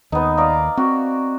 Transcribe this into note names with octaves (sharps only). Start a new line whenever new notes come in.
D#2 B3 D#4
D5 F5 A#5
C4 F#4